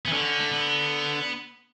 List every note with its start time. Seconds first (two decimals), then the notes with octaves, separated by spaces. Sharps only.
0.05 B3
0.08 E3
0.13 D3 C#4
0.40 A3
0.51 B3